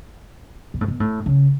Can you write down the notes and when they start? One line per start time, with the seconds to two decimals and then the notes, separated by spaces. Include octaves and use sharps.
0.74 B2
0.81 A2
0.88 B2
1.00 A2
1.26 C#3